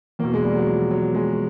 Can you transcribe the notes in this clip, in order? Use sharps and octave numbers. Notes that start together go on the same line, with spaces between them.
E2 B2 A#3
G#3
G3
F#3
F3
F#3
G#3